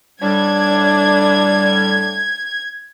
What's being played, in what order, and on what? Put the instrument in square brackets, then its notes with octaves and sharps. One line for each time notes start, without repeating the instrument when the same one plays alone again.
[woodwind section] A2 D3 G3 [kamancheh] D4 [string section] G#6